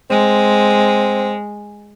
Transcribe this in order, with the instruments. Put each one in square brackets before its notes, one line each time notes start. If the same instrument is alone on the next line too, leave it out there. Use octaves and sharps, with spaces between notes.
[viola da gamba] G#3 [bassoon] C4